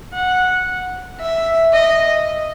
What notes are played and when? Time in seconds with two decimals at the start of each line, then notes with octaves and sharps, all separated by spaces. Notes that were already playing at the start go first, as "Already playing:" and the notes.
0.13 F#5
1.20 E5
1.73 D#5